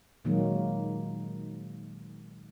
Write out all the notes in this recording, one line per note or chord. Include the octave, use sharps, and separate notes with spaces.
A#2 D#3 F#3 G#3 A#3